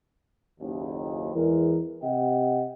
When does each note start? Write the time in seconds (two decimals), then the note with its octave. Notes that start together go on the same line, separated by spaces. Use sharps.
0.60 F#1 D#2
1.34 E2 E3 G#3 A#4
2.03 C3 D#5 F#5 G5